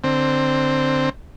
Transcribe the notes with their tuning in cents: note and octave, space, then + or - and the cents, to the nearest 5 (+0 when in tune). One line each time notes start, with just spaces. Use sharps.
D3 +10 C4 +0